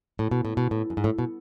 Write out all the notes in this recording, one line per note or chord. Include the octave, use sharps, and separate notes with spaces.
A2
B2
A2
B2
A2
F#2
G#2
A2
B2